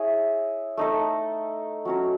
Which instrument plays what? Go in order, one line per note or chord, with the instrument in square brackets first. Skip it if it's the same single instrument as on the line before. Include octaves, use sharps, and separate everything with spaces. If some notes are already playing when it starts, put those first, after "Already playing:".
Already playing: [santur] E4 G#4 C#5 E5
A3 D#4 A4
F#3 C#4 F#4